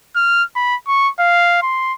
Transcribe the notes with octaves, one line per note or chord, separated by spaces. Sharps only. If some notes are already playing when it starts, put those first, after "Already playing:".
F6
B5
C#6
F5
C6